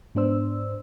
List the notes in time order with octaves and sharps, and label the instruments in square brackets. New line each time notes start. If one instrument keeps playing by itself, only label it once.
[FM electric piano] G#2 B3 D4 C5 E6